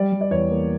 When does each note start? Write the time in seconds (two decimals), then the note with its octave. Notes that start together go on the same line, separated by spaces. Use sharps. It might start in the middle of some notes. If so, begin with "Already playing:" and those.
Already playing: G3 D5
0.12 G3
0.21 D5
0.31 E2 C#5
0.50 A#3